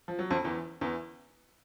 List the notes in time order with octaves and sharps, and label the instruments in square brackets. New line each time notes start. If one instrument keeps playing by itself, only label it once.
[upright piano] F3
F#3
F2 F3
E2 E3
E2 E3